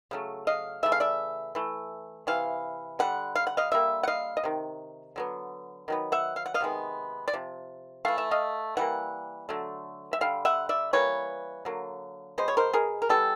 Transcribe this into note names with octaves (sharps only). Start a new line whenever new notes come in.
C#3 F#3 A3
D#5 F5
C#3 E3 A3 E5
F5
D5 E5
E3 A3
C3 E3 F5
D3 G3 F#5
F5
F#5
D#5 F5
D3 G3 A#3 E5
F#5
D#5 F5
D#5
C3 D#3
D3 F#3 B3
D#3 F#3 B3
E5 F#5
F5
F#5
D#5 F5
C3 D#3 G#3 B3
D5
C3 F3
E3 A3 F5
E5
D#5 F5
E3 G3 A#3 F#5
D3 F#3 A3
E5
D3 G3 F5
E5 F#5
D5 E5
E3 G3 A#3 B4 C#5
D3 F#3 A#3
B2 G#3 B3 C5
C#5
A#4 C5
G#4 A#4
A#4
E3 G3 B3 G4 A4